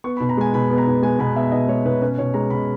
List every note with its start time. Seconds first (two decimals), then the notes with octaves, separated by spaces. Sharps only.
0.04 B3 C#6
0.17 B5
0.20 B2
0.29 A#5
0.37 G#3 G#5
0.54 B2 B5
0.70 B3
0.78 A#5
0.87 B2
1.02 G#3 G#5
1.19 B2 B5
1.36 B3 E5
1.52 B2 D#5
1.68 G#3 C#5
1.85 B2 B4
2.01 C#4 B4
2.18 B2 C#5
2.34 G#3 A#5
2.50 B2 B5